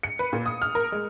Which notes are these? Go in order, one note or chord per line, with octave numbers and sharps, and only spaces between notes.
C#7
B4
A#2
D#6
F6
A#4
G#3